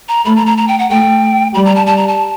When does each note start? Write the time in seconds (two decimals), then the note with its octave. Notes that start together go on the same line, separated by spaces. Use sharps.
0.09 A#5
0.25 A3 B5
0.36 A#5
0.47 A#5
0.58 A#5
0.68 G5
0.79 F#5
0.90 A3 G5
1.54 G3 B5
1.65 A#5
1.76 A5
1.87 A5
1.97 A#5
2.08 A5